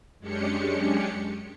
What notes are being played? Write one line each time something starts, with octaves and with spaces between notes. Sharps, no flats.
F#2 G#3 C#4 D4 G4 C#7